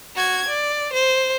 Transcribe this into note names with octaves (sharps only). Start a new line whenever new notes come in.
F#4 G#6
D5
C5